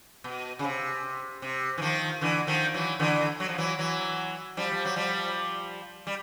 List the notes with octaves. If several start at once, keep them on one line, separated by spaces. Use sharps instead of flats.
B2
C#3
C3
C3
E3
D#3 F3
D3 E3
D#3 F3
E3 F#3
D3 E3
F#3
F3
E3 F#3
E3 F#3
F3 G3
F3
F#3
F3 G3
G3